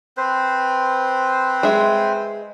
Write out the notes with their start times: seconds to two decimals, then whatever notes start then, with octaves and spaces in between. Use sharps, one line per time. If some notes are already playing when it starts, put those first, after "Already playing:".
0.17 C4 B4 C5
1.63 G#3 E5